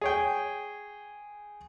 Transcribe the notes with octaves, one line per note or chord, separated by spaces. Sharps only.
G#4 C#5 G5